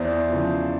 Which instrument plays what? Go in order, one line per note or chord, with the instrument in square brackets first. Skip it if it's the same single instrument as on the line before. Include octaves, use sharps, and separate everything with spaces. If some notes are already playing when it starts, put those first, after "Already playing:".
Already playing: [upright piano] E2 C5 D5
C#3 F3